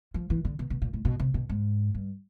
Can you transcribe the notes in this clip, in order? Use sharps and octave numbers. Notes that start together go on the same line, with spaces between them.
F3
E3
D3
B2
B2
A#2
A2
B2
C3
B2
G#2
G2